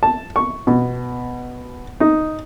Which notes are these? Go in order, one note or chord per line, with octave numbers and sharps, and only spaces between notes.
A5
C#6
B2
D#4